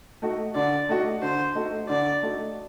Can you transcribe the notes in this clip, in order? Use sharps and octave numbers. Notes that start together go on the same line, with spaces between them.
A3 D#4 F#4
D3 D5
A3 D#4 F#4
D3 C5
A3 D#4 F#4
D3 D5
A3 D#4 F#4